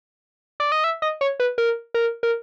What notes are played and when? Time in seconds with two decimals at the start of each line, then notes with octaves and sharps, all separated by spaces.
0.60 D5
0.72 D#5
0.84 E5
1.02 D#5
1.21 C#5
1.40 B4
1.58 A#4
1.94 A#4
2.23 A#4